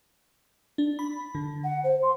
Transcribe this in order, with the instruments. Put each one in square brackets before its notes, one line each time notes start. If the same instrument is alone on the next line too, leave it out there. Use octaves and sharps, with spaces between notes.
[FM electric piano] D4
B5
D3
[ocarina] F#5
C5
C6